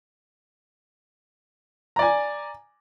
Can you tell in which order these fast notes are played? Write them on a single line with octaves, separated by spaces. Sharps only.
A#5 D5 G#5